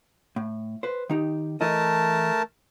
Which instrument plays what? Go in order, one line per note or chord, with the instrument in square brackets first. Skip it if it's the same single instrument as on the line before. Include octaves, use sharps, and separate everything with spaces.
[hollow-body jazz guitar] A2
B4 C5
D#3 D#4 G4
[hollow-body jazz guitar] E3 E4 D#5 [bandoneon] A3 A#4 A5